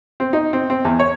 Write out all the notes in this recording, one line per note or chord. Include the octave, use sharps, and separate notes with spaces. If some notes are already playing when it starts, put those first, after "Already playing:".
C4
D#4
C4
C4
E2
C#5